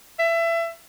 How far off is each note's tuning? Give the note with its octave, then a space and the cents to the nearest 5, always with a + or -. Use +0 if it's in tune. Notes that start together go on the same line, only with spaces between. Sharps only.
E5 +25